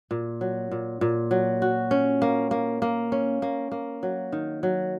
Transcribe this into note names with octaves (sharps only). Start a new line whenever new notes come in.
A#2
F#3
A#2
A#2
F#3
F#4
C#4
A#3
A#3
A#3
C#4
A#3
A#3
F#3
D#3
F#3